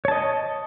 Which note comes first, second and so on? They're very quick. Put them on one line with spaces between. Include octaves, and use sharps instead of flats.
C#5 A5 D#5